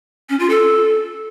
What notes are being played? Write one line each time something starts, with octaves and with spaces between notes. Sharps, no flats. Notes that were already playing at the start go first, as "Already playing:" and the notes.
C#4
F4
A4